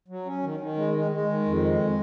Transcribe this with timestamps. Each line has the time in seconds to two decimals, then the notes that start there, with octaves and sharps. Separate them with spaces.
0.08 F#3
0.25 C#4
0.43 D#3
0.60 D#3
0.77 G#3
0.94 G#3
1.11 G#3
1.29 D#3
1.46 F2
1.63 G#3